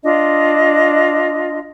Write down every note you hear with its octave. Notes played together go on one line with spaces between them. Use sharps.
D4 F4 D#5